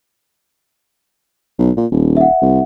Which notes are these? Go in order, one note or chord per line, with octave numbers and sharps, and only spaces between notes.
B1
A#2
D#1
E5 F#5
C2